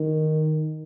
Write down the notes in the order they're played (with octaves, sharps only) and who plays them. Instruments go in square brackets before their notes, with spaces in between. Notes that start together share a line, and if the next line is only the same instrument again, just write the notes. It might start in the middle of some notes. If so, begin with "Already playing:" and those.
Already playing: [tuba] D#3